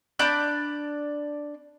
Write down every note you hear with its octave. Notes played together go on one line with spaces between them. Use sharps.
D4 D5 B5 G6